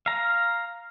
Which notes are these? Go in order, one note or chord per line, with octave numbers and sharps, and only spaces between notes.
F5 A#5